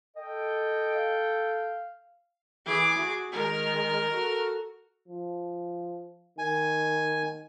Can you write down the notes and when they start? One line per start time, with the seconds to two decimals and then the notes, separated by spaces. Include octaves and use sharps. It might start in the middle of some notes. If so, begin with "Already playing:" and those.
0.16 A4 D#5 G5
0.95 F5
2.66 E3 G#4 D6
2.99 F#4
3.32 D#3 G#3 A#4 F6
4.12 F#4 A4
5.08 F3
6.38 D#3 G#5